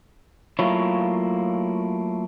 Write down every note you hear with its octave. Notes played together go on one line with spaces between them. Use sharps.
F#3 A3 A#3 E4 F4 C#5